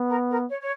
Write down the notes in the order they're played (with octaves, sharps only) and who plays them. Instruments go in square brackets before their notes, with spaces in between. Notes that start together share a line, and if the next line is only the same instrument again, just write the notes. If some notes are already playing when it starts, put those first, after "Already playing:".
Already playing: [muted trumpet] B3
[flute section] A#4
A#4
C#5
C#5